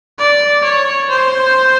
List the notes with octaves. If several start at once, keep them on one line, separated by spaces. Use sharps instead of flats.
D5
C#5
C5